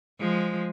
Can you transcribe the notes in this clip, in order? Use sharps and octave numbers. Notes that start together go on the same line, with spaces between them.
F3 G#3